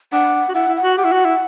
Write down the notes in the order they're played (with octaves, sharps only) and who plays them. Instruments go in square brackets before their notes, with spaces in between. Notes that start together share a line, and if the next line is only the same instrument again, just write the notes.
[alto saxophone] D4 [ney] F#5
[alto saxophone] F#4
[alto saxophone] E4 [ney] F#5
[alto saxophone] E4
[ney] F#5
[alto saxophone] F#4
[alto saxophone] G4 [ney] F#5
[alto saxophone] E4
F#4
E4